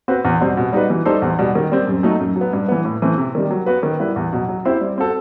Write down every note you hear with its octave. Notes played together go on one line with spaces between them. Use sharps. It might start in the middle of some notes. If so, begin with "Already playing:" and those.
C4 F#4 B4
E2
B2 G3 C4
B2
G3 D#4 F#4 B4
E3
G3 D#4 A4 C5
E2
B2 G3
D#3
G3 C4
F#2
F#3 A3 D#4
F#2
F#3
B3
G2
E3 B3
A2
E3 A3 C4
C3
D#3 G3
F#3
B3 F#4 B4
D#3
G3 B3 E4 B4
E2
B2 F#3
F#3
C4 E4 G4 C5
G3
C4 F#4 A4